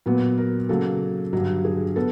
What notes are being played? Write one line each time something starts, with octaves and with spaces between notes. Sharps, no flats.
A#2 F#3 B3
A#4
C#3 F#3 A#3 A4
G2 D3 F#3
G#4
B3 A4